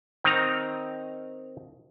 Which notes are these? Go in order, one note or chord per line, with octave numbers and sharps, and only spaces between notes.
D#3 C4 D#4 A#5